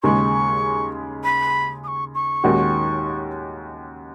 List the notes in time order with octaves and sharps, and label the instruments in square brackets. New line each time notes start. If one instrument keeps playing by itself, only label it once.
[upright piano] D#2 C#3 G#3 [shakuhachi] C#6
[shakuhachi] B5
D#6
C#6
C#6
[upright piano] D#2 D#3 G#3 C#4 F#4